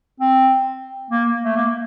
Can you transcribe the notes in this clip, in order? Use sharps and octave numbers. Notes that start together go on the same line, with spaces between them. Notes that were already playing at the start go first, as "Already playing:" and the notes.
C4
A#3
A3
A#3